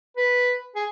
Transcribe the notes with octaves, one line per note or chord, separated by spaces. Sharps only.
B4
G#4